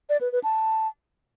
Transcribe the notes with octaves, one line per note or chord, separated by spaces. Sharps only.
D5
B4
B4
A5